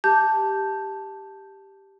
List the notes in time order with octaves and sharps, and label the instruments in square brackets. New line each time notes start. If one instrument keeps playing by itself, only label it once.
[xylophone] G4 A5 G6